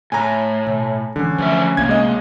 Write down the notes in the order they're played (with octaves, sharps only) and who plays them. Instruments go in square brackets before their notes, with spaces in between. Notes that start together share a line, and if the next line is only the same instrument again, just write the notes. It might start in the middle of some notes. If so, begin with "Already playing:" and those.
[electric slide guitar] A2 [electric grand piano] G#5 A#5
[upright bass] B2
[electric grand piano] D3 [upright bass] E3 G#3 [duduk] C#4
[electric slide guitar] F3 G3 E5 [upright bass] A3
[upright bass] C2 [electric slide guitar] A2 A#3 [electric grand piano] G#6
[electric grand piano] G#3 D#5